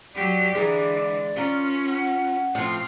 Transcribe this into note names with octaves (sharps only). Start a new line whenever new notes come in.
F#3 G4 D5
D3 E3 G#3 A#5
C#4 F4 A#4
F#5
A2 F3 C4 F4